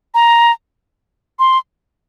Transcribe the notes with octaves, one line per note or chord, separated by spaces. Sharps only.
A#5
C6